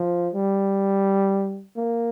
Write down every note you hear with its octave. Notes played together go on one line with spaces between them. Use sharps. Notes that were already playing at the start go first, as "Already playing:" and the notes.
Already playing: F3
G3
A#3